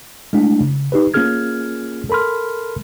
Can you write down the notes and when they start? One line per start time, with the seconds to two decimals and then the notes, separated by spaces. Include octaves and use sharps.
0.33 G#3 A3 D4 E4
0.60 C#3
0.92 D#4 G4 B4
1.14 A#3 C#4 F4 G#4 F6 G#6
2.10 A4 A#4 B5 C6 F6